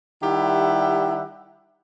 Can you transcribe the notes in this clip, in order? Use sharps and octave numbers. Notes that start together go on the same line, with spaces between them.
D#3 G3 E4 G4 E5 F#5